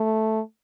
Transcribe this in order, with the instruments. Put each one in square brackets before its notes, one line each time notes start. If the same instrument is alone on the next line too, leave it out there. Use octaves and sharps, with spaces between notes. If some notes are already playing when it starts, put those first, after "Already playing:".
Already playing: [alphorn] A3